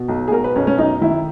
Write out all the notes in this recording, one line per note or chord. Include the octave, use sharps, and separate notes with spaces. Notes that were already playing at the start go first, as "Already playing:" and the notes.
Already playing: B2
B1
G#4
B2 A#4
B4
B1 C#4
C#4
F#2 D#4
D#3 E4